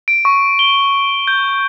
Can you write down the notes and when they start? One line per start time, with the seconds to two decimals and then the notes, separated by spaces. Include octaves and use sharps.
0.08 D7
0.25 C#6
0.59 G7
1.27 G6